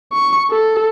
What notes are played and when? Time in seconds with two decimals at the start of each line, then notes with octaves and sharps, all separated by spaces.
0.13 C#6
0.51 A4